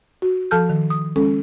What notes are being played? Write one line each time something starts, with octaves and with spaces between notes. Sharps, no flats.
F#4
F3 A4 A5 F6 G6
D#3
D#6
G#3 C#4 A4